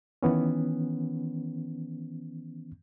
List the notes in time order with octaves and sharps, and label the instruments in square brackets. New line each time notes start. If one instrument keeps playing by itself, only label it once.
[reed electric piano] D#3 E3 B3 C#4